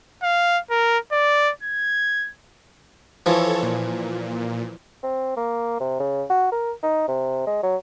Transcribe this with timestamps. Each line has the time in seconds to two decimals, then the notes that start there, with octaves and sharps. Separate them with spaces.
0.23 F5
0.71 A#4
1.12 D5
1.63 G#6
3.26 E3 F3 A4 C#5
3.63 A#2
5.03 C4
5.36 A#3
5.80 C3
6.00 C#3
6.30 F#4
6.52 A#4
6.83 D#4
7.08 C3
7.46 G#3
7.63 F#3